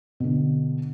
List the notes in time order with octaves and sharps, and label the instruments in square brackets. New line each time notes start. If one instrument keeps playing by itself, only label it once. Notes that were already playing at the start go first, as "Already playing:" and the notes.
[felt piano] B2 D3